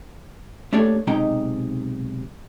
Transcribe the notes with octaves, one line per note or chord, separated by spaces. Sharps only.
A3 A#3 D4 G4 A4 C#5
B1 C3 G#3 D#4 G5 A#5